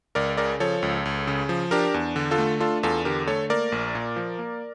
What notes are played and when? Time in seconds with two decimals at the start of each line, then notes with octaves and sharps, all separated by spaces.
0.15 C#2 A#4 D5
0.37 C#3 A#4 D5
0.60 F3 A4 C#5
0.83 C#2
1.05 C#2
1.27 C#3
1.49 F3
1.71 D4 G4 A#4
1.94 E2
2.16 D3
2.31 F4 A4
2.38 A3
2.60 D4 F4 A4
2.83 E2 F4 A4
3.05 D3 G4 A#4
3.28 A3 A4 C#5
3.50 A#3 A#4 D5
3.72 A#1
3.95 A#2
4.16 F3
4.39 A#3